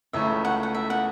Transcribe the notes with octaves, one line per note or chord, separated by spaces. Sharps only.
C#2 C#3 E3 A3 C#4 E5
F#5
F#5
E5
F#5